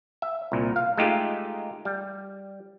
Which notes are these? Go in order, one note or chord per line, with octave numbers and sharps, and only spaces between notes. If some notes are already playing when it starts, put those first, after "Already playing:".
E5
C2 A#2
F5
G#3 A3 D#4 F4 G4
G3